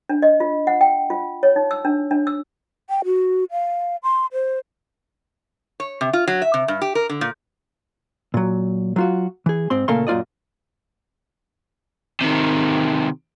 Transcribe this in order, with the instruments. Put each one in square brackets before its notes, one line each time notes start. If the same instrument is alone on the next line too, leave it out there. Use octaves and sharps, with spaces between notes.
[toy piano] D4
D#5
F4
F#5
G5
F4
C#5
D#4
E6
D4
D4
E6
[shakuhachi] G5
F#4
F5
C6
C5
[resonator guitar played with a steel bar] C#5
C3
F4
F#3
E5
C3
G2
G4
A#4
D3
A#2
[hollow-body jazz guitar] A#2 F#3
F#3 F4 F#4
E3 G#4
G#2 C4 C6
A#2 C#3 A3 A#3 A4 C6
F#2 A#2 F4 D5 D#5
[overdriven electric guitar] C3 D#3